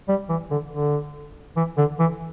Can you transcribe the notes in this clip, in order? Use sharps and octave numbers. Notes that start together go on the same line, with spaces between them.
G3
E3
D3
D3
E3
D3
E3